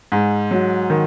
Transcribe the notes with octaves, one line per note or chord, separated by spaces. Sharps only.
G#2
F#3
D#3